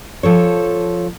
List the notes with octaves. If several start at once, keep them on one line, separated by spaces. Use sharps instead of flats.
F3 A4 C#5